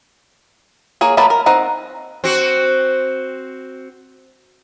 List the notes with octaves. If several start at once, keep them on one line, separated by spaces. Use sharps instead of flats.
A#3 G#4 C#5
F#3 A#3 B3 A5 B5
A#4
C4 D#4 F#5
C4 F#4